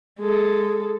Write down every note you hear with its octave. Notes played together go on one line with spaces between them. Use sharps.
G#3 A4